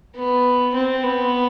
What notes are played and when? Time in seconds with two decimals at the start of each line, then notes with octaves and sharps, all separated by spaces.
0.15 B3
0.74 C4
1.04 B3